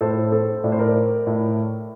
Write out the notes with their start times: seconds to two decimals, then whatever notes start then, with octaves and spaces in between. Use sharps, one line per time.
0.01 A2 A4 C5
0.32 A4 C5
0.64 A2 D5
0.72 C5
0.79 A#4 D5
1.27 A2